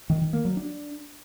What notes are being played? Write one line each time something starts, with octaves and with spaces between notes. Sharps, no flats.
D#3
D#3
A#3
F#3
D4